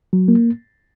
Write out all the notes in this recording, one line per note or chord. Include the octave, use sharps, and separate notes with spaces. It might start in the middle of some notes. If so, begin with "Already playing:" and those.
F#3
A#3